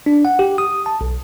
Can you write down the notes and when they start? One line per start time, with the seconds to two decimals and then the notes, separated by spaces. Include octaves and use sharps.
0.06 D4
0.25 F#5
0.39 G4
0.58 D#6
0.86 A5
1.01 B1